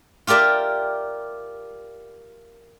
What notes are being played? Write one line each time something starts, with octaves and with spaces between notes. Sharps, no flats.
F4 G4 A#4 D5 E5